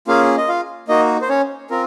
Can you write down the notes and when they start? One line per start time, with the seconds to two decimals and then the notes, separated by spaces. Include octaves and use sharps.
0.07 A#3 C#4 F4 G#4 F5
0.37 D#5
0.49 F4 F5
0.88 A#3 D#4 F#4 D#5
1.21 C5
1.29 C#4 C#5
1.70 C4 F4 A#4